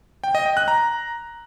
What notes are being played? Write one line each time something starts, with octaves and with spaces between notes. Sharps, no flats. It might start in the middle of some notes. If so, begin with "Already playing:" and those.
G5
D#5
G5
F#6
A#5